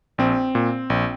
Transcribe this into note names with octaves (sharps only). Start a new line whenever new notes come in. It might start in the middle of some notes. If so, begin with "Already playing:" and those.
A#1 C4
A#2
A#1